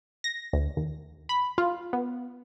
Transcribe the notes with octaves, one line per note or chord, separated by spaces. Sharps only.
A#6
D2
D#2
B5
F4
B3